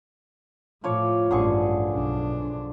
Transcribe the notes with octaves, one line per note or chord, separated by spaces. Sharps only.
A2 F3 C#5 D6
A1 G2 D3 G#4 C#6
B1 D4